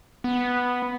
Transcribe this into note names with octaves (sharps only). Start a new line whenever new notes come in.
B3